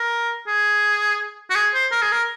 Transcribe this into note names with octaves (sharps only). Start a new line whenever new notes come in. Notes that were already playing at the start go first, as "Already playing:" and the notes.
Already playing: A#4
G#4
F#4
G#4
C5
A#4
G#4
A#4